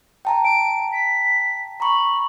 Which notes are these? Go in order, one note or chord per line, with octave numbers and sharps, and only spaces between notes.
G5 A5 A#5
D7
B6
A#5 B5 C#6